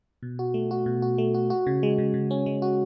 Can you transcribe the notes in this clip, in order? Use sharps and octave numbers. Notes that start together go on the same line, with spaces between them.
B2
F#4
A3
F#4
B2
F#4
A3
F#4
F#4
C#3
G#3
C#3
C#3
C#4
G#3
F#4